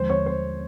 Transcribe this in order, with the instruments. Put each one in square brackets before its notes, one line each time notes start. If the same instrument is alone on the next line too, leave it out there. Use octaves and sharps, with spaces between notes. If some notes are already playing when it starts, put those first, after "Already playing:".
Already playing: [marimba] D#2 D3 F3 G#3 [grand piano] C5
[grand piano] C#5
C5